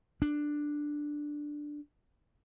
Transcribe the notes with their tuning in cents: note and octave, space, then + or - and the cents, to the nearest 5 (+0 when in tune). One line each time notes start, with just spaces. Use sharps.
D4 +5